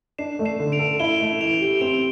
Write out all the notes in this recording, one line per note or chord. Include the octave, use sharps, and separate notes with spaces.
D4 C7 E7
A3
C7 E7
D3
D7 F7
A4
E4 E7 G7
A3
E3 D7 F7
G4
C4 D7 F7